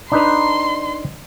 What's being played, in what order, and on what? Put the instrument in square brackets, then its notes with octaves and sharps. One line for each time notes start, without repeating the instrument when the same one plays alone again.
[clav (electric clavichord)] D4 D#4 B4 [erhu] C6